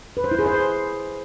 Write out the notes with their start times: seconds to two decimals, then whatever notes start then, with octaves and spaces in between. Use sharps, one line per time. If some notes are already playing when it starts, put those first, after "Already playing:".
0.17 B4
0.24 C5
0.31 E4
0.39 G#4
0.46 C5